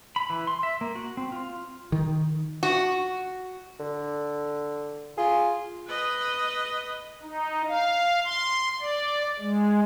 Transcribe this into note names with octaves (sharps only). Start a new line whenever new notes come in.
B5
E3
C6
E5
A#3
F#4
C4
F4
D#3
F#4
D3
F4 G#4
B4 D#5
D#4
F5
C6
D5
G#3